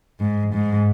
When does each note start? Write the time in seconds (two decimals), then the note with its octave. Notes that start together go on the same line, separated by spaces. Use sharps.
0.20 G#2
0.53 G#2